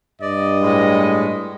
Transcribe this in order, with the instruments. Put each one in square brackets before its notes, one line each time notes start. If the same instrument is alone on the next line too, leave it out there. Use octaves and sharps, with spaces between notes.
[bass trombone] G2 [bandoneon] D5 [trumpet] D#5
[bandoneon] A2 G#3